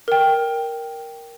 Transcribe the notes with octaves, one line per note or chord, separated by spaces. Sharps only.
A#4 G5